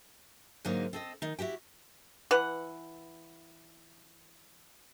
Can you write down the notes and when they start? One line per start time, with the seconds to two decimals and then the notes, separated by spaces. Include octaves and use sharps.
0.65 G#2 D3 F#3 G#3 A#3 D#4
0.93 C4 A4 D#5
1.22 D#3 D#4
1.39 E4 F#4 G4 G5
2.31 E3 B4 F#5